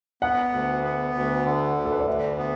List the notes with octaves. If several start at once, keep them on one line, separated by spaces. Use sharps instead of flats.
B3 F#5
D2
B3
D2
D3
D2
A4
B4
D5
D2 E5
B3